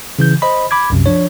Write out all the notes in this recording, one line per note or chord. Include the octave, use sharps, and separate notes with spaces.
C#3 E3 G6
C5 D#5 B5
B5 D6 G#6
C2 F#2 C3
F3 D4 C#5